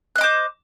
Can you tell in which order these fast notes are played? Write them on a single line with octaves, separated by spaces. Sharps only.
F#6 D#5 D6 C5